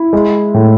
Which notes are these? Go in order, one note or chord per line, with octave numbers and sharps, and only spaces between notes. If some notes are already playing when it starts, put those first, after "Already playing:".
Already playing: E4
G#3
A2